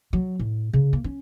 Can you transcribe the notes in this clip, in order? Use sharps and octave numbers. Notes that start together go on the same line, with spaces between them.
F#3
A2
C#3
A#3
C#4